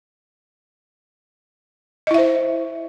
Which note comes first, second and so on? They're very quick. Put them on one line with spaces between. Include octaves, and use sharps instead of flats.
D#5 E4 E5 C5